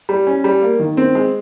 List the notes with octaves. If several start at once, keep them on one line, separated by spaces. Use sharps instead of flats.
G3
C#4
G3
A#3
D#3
C4
G#3